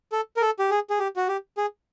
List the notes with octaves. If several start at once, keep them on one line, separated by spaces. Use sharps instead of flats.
A4
A#4
A4
G4
G#4
G#4
G4
F#4
G4
G#4